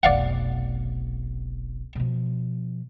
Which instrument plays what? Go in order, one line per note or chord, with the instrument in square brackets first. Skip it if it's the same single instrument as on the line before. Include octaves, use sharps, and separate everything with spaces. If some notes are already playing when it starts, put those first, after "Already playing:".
[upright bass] F1 B1 [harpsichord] D5 F5 F#5
[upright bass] B2 F3